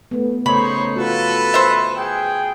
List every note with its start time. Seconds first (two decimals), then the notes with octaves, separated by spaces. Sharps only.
0.11 A3 B3
0.46 C#3 A3 D#4 C5 C#5 B5
0.96 F4 F#4 A4 B4
1.54 C5 E5
1.96 G#4 G5